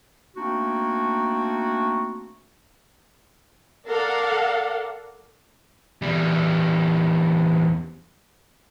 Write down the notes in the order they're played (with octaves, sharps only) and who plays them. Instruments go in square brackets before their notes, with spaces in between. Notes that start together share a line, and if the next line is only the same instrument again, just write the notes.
[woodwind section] A3 A#3 C4 D4 D#4 F#4
[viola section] A4 A#4 D5 F5 F#5
[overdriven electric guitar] E2 G3